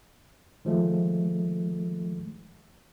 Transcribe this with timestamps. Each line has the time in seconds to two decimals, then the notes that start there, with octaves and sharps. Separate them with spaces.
0.65 D#3 F3 G#3 A3